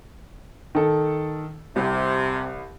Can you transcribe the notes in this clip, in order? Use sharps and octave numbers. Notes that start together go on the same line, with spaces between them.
D#3 A4
C2 C3